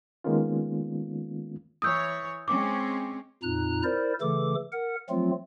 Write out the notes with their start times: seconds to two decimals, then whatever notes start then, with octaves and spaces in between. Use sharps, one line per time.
0.24 D#3 G#3 A#3 B3 C#4 F4
1.82 E3 C#5 D#6 E6 G6
2.48 G#3 C4 C#4 D6
3.43 F2 A#2 D#4 A#5 F#6
3.84 E4 A#4 C5 D5
4.21 C#3 E3 A3 A4 D6
4.72 A#4 F#5
5.10 F3 F#3 A3 C4 F4